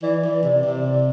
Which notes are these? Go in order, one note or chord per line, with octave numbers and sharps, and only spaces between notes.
E3 D5
D5
E3
D5
C3 D5
D5
C3
D5
D5